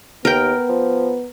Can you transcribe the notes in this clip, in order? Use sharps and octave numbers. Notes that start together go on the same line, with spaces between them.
D#2 B3 A#4 G5
F3